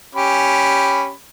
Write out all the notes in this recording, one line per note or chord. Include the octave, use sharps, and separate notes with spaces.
C#4 G4 B5